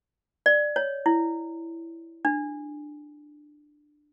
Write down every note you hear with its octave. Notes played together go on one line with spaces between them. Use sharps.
D5
C#5
E4
D4